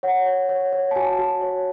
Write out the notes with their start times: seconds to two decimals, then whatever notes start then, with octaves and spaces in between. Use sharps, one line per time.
0.03 C#5 F#5
0.26 C#5
0.49 C#5
0.73 C#5
0.91 A5
0.95 F#4 G#5
1.19 F#4
1.42 C#5